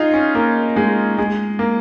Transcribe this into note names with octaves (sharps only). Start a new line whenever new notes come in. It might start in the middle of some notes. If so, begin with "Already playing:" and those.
Already playing: D#4 F4 G#4
C#4
A#3
G#3
G#3
A#3